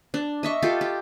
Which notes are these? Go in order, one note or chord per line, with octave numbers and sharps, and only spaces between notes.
D4
D#5 E5 C#6
F4 G4 A4
G4